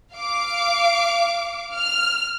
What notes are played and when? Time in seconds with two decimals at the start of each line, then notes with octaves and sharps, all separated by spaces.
0.13 F5 D6
1.74 F6